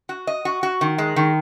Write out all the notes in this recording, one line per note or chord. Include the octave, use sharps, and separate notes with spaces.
F#4
D#5
F#4
F#4
D#3
G#3
D#3